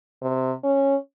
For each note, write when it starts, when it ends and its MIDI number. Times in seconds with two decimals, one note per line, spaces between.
0.22 0.52 48
0.63 0.95 61